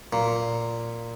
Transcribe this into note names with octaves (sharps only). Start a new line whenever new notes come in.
A#2